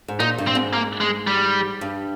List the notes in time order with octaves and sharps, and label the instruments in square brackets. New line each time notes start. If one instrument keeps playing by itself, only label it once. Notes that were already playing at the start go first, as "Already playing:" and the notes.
[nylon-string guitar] G#2
[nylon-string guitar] A#2 [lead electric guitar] D#4
[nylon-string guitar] G2
[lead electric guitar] C4
[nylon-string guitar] G#2
[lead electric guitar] A#3
G#3
G3
[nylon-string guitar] G2